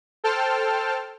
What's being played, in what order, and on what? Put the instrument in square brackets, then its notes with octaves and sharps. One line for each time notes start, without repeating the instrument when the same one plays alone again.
[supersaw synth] A4 C5 G5 A5 F6